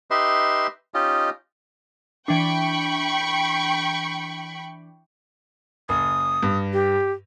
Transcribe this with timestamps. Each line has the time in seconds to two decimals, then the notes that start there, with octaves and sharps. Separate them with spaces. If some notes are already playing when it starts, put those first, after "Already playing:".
0.11 D#4 G4 B4 D#5 E5 C6
0.94 C#4 D#4 F4 G4 D#5
2.28 E3 D4 G5 B5 C#6
5.89 F#1 D#6
6.43 G2
6.73 G4